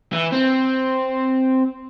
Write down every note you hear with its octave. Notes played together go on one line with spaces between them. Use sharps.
E3
C4